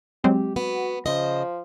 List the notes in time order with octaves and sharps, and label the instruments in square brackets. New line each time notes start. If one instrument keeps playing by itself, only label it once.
[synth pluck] F#3 G#3 C4 [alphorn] G4
[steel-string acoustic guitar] B3 [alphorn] F#4
[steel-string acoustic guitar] C#3 C5 D#5 [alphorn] F3